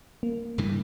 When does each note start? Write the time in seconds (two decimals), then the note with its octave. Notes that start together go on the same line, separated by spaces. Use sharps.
0.23 A#3
0.58 G2 C#3 E3